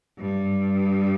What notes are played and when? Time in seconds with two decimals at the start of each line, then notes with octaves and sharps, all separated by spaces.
0.18 G2